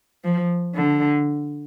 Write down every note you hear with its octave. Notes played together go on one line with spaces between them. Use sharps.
F3
D3